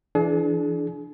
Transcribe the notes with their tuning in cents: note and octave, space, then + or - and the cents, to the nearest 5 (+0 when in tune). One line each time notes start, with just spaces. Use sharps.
E3 +20 D4 +0 G#4 +40